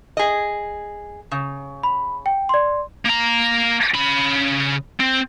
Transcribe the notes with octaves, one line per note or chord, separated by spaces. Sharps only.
G#4 D#5
C#3
B5
G5
D5 C6
A#3 A#5
C#3 B5
C4